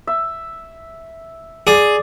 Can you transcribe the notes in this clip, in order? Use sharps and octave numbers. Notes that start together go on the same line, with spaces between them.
E5
G#4 D5